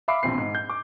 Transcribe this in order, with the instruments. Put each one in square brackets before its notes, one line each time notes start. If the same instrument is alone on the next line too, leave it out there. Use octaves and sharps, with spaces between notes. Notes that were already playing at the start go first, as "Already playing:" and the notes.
[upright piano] E5 F5 B5 D6 C7
E1 A#1 C4 C7
G#2
G6
D6